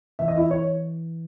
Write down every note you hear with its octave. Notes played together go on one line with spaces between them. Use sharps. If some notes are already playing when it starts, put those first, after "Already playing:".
E3 E5
D#5
E4 E5
C#5